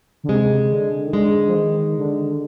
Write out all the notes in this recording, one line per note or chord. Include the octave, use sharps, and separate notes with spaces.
D3
C3 G#3
D3
D#3
D3 G#3
F3
D#3
D3